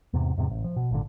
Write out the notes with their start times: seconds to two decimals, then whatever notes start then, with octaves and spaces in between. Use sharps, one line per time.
0.13 E2 G#2 C3
0.37 E2 G#2 C3
0.50 A1
0.64 F3
0.76 B2
0.91 G#1 A#2 D3